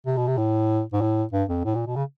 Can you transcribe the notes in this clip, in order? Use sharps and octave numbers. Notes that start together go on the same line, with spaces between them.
C3
B2
C3
A2
G#2
A2
G2
F2
A2
A#2
B2
C#3